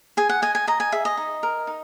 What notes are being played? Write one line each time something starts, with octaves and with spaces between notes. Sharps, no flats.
G#4 G#5
F#5
D#5 G#5
G#5
D#5 A#5
G#5
G#4 E5
D#5
D#4
A#4
D#4